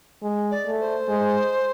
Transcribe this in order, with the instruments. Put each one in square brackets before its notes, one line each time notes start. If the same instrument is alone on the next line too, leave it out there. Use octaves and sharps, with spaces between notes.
[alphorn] G#3
[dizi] D5
[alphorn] A3
[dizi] C5
[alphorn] G#3